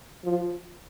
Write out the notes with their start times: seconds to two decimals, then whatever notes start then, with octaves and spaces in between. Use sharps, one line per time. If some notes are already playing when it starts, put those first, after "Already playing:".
0.24 F3